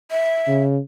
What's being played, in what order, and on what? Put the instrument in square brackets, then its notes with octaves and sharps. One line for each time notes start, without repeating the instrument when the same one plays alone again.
[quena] E5
[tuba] C#3